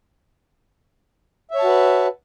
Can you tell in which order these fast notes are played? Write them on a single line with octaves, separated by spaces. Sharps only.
E5 C#5 A5 F#4 B4